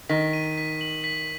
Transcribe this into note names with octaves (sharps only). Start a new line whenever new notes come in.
D#3 B6
D#7
B6
F#7
B6